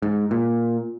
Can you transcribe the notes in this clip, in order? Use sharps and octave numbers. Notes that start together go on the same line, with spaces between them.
G#2
A#2